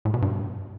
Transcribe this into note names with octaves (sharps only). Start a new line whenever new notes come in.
A2
B2
G2